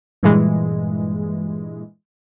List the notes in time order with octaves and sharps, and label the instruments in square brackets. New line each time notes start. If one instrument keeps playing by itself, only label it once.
[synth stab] G2 A#2 E3 G#3